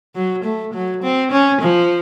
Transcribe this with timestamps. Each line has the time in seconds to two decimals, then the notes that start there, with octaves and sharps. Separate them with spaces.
0.15 F#3
0.44 A3
0.74 F#3
1.03 C4
1.32 C#4
1.61 F3